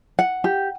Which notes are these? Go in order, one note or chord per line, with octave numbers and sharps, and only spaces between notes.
F#5
G4